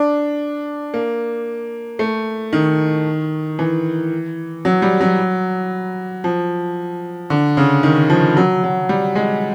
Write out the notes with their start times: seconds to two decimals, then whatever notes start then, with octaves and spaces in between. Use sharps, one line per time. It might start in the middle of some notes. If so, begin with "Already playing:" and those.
Already playing: D4
0.94 A#3
1.99 A3
2.53 D#3
3.59 E3
4.65 F#3
4.82 G3
5.01 F#3
6.24 F3
7.30 D3
7.57 C#3
7.83 D#3
8.10 F3
8.37 F#3
8.64 F#3
8.89 G3
9.15 G#3